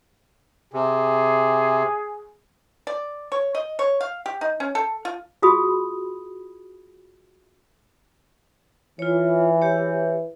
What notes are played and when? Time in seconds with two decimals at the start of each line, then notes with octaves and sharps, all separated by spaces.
0.73 C3 G#4
2.87 D5
3.32 C#5
3.55 D#5
3.79 C#5
4.01 F5
4.26 G4
4.41 D#4
4.60 C#4
4.75 A4
5.05 F4
5.42 F4 F#4 G#4 B5 D#6
8.99 E3 F4 C#5
9.62 G4 C#5